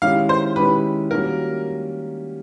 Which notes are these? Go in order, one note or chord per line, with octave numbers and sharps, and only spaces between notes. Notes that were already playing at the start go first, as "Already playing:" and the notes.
D#3 G#3 C#4 E4 G4 F5
C5
D#3 G#3 C#4 E4 G4 B4
D#3 G3 A#3 C#4 F#4 A#4